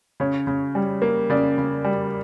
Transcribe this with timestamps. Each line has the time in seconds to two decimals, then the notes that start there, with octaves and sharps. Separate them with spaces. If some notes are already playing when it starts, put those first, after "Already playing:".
0.20 C#3 C#5
0.47 C#3
0.75 G3
1.02 A#3
1.30 C#3 D5
1.58 C#3
1.84 G3